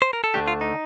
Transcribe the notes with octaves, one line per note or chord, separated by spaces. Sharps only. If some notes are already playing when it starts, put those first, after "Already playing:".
C5
A#4
A4
D2 D3 A3 D4 G4
F4
D#4